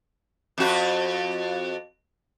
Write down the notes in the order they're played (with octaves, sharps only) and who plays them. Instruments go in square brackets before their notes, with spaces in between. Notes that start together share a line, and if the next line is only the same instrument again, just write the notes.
[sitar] F2 F#4